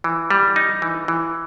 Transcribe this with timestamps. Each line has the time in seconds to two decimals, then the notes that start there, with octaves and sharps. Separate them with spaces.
0.04 E3
0.31 G3
0.56 D#4
0.82 E3
1.08 E3